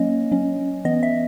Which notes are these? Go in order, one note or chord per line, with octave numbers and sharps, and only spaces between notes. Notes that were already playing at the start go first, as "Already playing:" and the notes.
Already playing: F#3 A#3 C#4 D#5
F#3 C#4
E3 B3 D#5
E5